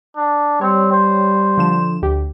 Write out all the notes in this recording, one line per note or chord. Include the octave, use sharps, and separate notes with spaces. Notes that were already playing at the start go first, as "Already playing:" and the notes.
D4
G3 C4 C#5
C5
D3 F3 E7
D2 G4